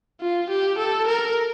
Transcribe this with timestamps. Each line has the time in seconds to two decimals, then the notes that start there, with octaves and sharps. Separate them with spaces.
0.21 F4
0.50 G4
0.78 A4
1.07 A#4